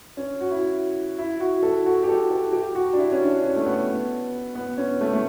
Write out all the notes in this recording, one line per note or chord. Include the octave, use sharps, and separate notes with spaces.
C#4
F#4
E4
E4
F#4
A4
F#4
G4
A4
A4
G4
F#4
D4
E4
C#4
D4
C#4
A3
B3
B3
C#4
A3
A3